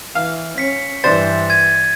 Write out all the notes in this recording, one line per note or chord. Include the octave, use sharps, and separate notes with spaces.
E3 F5
C#4 B6 C#7
G2 E3 D4 C5 A6
G#6 D#7